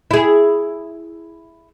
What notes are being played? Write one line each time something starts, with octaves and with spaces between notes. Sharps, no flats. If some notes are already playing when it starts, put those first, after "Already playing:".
E4 G#4